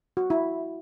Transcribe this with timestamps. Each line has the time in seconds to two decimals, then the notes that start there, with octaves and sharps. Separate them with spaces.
0.17 F#4
0.30 E4